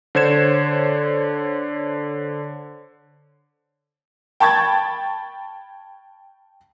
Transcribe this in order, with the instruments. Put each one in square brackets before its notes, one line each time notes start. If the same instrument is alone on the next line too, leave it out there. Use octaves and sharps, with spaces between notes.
[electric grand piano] D3 C5 C#5 G#6 E7
[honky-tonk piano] G5 A5 B5 C#6 G#6 A6